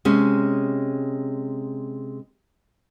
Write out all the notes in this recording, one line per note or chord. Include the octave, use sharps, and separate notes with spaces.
C3 G#3 C#4